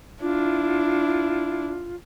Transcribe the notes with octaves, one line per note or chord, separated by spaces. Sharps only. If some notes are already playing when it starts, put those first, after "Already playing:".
D4 E4 F4